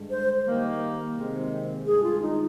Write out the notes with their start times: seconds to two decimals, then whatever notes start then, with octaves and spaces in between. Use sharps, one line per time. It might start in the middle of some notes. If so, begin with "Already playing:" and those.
Already playing: G2 D3 G#3
0.10 C5
0.45 D#3 G3 A#3
1.16 C3 D#3 G#3 C4
1.86 G2 D#3 G#3 G#4
2.03 F4
2.22 D#4